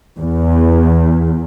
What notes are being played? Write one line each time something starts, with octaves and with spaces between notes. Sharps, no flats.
E2